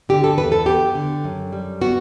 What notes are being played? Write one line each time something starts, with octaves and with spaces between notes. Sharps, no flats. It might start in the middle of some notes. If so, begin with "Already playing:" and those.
D3 G4
A4
E2 B4
A4
B3 G4
D3
F#2
G3
B3 F#4